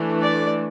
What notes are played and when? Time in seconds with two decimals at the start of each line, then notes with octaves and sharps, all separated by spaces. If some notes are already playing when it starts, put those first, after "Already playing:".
Already playing: E3 A3 D4
0.21 D5